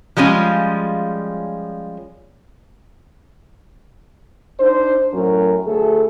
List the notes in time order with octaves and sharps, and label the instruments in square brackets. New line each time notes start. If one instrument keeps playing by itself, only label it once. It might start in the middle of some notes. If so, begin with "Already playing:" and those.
[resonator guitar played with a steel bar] F3 G3 G#3 C#4 F4
[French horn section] D4 D#4 C5
F#2 A2 F#3 C#4 A#4
D2 A3 G#4 A4